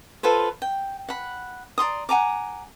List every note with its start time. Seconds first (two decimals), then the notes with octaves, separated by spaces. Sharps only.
0.23 F4 A4 B4 C5
0.62 G5
1.09 F#5 B5
1.78 D5 A#5 C6 D#6
2.09 F#5 G#5 A#5 D6